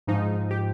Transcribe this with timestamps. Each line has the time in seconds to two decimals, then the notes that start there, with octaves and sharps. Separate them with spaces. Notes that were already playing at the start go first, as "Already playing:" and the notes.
0.07 G#2 F3 D#4
0.51 G4